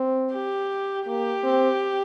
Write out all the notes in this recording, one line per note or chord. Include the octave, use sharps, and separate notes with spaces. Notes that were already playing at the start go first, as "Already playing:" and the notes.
Already playing: C4
G4
A#3 G4
C4